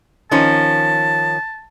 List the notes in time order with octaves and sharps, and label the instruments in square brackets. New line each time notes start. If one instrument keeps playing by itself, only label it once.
[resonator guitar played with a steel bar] D#3 F3 C#4 [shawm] A5